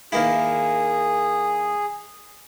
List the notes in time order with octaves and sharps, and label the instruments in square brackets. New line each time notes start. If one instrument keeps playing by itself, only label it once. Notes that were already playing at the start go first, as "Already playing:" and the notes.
[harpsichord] D#3 A#3 E4 [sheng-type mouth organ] G#4